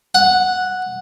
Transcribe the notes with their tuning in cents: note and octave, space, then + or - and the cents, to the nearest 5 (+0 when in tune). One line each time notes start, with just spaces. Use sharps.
F#5 -5